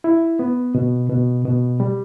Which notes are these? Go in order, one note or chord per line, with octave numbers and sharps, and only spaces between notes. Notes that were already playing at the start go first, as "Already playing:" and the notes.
E4
B3
B2
B2
B2
G3